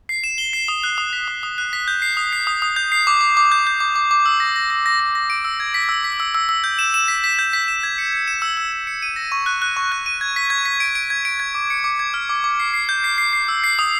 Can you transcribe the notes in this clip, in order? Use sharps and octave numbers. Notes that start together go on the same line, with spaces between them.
C7
E7
G7
C7
D#6
F#6
D#6
B6
D#6
D#6
F#6
B6
G6
C7
D#6
C7
D#6
D#6
G6
C7
D6
D6
D6
G6
G6
D6
D6
D6
E6
A#6
A#6
A#6
A#6
A#6
A#6
D7
E6
G#6
B6
E6
B6
E6
E6
E6
G6
E7
E7
B6
B6
G6
B6
E7
G#6
C#7
C#7
E7
E6
E6
E6
C#7
D#7
A#6
C#6
F#6
F#6
C#6
F#6
D#7
G#6
B6
G#6
B6
D7
D7
G#6
D7
G#6
D6
C#7
D6
G#6
F6
D6
D6
C7
C7
G6
C7
C7
C7
E6
C7
D#6